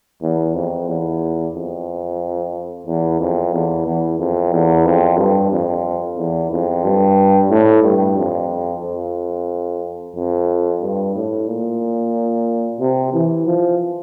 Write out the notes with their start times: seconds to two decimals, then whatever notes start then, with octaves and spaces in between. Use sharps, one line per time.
0.22 E2
0.54 F2
0.88 E2
1.54 F2
2.86 E2
3.20 F2
3.52 E2
3.86 E2
4.19 F2
4.52 E2
4.85 F2
5.18 G2
5.51 F2
6.18 E2
6.51 F2
6.84 G2
7.50 A2
7.83 G2
8.17 F2
8.82 F2
10.15 F2
10.81 G2
11.15 A2
11.48 A#2
12.80 C3
13.13 E3
13.46 F3